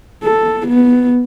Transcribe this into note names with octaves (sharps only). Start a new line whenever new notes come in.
A4
B3